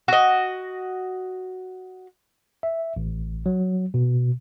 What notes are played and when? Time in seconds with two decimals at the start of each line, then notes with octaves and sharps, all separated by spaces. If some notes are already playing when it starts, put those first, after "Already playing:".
0.08 F#4 D#5
2.63 E5
2.96 A1
3.46 F#3
3.94 B2